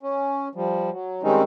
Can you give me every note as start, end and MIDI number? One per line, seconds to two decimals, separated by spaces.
0.03 0.48 61
0.55 0.90 53
0.55 0.90 55
0.91 1.22 54
1.23 1.43 51
1.23 1.43 55
1.23 1.43 56
1.23 1.43 60
1.23 1.43 61
1.23 1.43 63